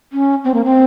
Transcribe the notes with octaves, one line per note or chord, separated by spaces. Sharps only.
C#4
C4
A#3
C4